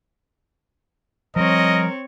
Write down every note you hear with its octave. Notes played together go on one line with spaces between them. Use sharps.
F3 G3 C4 A#4 C#5 D#5